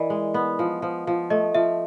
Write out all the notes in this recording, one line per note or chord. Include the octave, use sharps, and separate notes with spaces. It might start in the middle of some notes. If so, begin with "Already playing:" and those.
Already playing: E3 A#4 D5 D#5
G#3
B3
F3
F3
F3
A3 D#5
F3 E5